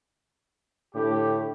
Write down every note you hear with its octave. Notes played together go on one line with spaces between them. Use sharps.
A2 D3 G4